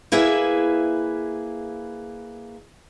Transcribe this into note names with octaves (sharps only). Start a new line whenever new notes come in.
A#3 E4 G#4 B4 E5